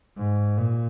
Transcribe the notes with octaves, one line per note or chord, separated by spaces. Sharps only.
G#2
A#2